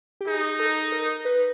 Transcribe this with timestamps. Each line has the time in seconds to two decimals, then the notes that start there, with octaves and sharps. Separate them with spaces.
0.21 G4
0.27 D#4 G#4
0.59 A4
0.92 A#4
1.25 B4